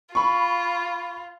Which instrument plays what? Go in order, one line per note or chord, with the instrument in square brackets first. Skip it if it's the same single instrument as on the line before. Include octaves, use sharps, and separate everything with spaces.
[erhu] F4 [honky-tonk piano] B5 C#6